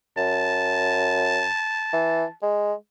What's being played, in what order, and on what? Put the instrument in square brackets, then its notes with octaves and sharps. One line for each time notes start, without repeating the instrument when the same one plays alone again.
[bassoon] F#2 [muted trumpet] A5
[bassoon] E3
G#3